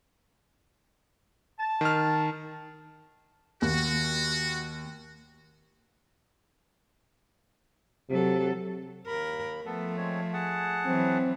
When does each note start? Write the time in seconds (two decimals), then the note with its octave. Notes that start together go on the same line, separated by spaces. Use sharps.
1.60 A5
1.81 D#3 F6
3.62 D#2 F#4
8.10 C3 F#3 A4
9.07 D#2 A#4 B5
9.66 F3 A3 B3 A4
9.97 G#3 C4 C#5
10.33 G#4 F#5 A5
10.85 E3 F#3 C4